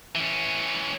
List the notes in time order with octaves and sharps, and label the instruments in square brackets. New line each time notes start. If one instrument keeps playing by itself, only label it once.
[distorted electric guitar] E3 C#4